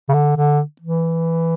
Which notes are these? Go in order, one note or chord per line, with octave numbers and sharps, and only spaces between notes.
C#3
D3
D3
E3